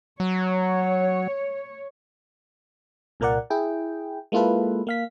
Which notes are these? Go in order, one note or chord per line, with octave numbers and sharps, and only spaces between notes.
F#3 C#5
C2 A#2 A#3 A#4 D5 F#5
E4 G#4 G5
G#3 A#3 E4 F4 A4 B4
A#3 F5 B6